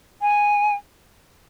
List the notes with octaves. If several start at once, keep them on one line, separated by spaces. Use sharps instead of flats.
G#5